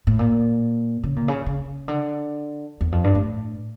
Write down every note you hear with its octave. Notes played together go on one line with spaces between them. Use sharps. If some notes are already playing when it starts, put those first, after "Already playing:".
A2
A#2
C#3
A#2
C#3
C#3
D3
E2
F2
G2
A2